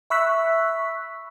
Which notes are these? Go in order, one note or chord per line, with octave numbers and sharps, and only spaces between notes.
E5 B5 C#6 E6 F#6 B6